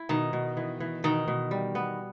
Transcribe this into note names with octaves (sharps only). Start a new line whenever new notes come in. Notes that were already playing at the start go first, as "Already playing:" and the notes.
Already playing: E4
B2 D#3
B2
E3
E3
B2 D#3
B2
G3
B3